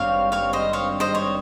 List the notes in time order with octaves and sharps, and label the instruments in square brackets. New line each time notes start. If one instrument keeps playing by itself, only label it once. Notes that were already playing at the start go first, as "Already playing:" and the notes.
Already playing: [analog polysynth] G#1 G2 G3 C4 [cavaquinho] C#5 F5
[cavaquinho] C#5 F5
C5 D#5
C#5 F5
C5 D#5
C#5